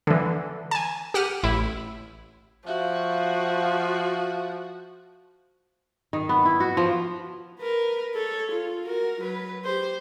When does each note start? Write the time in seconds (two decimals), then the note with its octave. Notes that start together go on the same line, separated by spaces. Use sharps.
0.07 D3 E3
0.71 G#5 A5
1.14 G4 F#5 F6 D#7
1.43 A1 E4
2.67 F3 F#4 E5 F5 C#6
6.13 D#3
6.29 B3
6.45 E4
6.60 F#4
6.77 F3
7.60 A#4 B4
8.14 A4 C#5
8.52 F4
8.86 F#4 A#4
9.21 F#3 B4
9.64 G4 C5